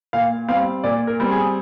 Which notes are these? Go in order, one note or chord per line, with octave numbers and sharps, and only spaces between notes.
A#2 F5
G3 C4 F5
A#2 D5
A#4
G3 C4
G#4